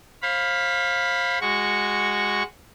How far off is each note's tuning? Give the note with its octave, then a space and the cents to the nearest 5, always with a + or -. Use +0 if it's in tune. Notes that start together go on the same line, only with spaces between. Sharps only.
C5 +40 F5 +5 B5 +0
G#3 -10 F#4 +0 C#6 +0